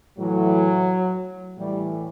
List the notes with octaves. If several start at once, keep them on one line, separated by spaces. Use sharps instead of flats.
A2 E3 F#3
A2 E3 G3